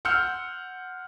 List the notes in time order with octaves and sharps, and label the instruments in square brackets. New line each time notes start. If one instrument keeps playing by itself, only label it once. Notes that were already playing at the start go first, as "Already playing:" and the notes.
[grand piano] F#5 C6 E6 F6 G6 C#7